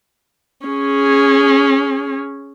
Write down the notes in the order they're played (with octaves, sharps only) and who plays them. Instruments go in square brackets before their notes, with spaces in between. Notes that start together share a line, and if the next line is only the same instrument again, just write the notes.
[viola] C#4 G#4